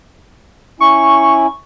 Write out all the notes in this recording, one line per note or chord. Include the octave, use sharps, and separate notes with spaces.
C#4 E4 C#6